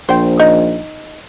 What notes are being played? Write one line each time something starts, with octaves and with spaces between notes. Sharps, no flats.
A#1 C5 G5
D#4